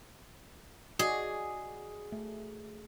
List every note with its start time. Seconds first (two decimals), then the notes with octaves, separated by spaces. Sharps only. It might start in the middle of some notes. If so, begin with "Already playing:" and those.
0.99 F#4 G#4 D5 D#5
2.12 A3